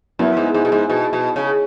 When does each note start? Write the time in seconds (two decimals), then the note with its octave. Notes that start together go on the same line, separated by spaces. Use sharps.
0.19 F#2 B3 E4
0.37 G#2
0.54 G#2
0.65 B2
0.72 G#2
0.90 B2
1.13 B2
1.36 C#3